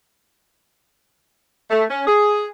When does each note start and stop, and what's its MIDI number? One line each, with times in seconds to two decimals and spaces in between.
1.70 1.84 57
1.90 2.04 61
2.08 2.47 68